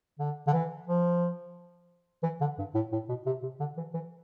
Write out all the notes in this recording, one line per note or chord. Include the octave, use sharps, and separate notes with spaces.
D3
D3
E3
F3
E3
D3
G2
A2
A2
B2
C3
C3
D3
E3
E3